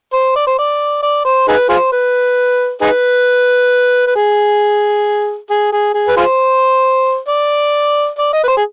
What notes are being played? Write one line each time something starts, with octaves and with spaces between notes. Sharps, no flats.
C5
D5
C5
D5
D5
C5
D#4 G#4 B4
F4 G#4 C5
B4
D#4 G#4 B4
B4
G#4
G#4
G#4
G#4
B4
F4 G#4 C5
D5
D5
D#5
B4
C5
G#4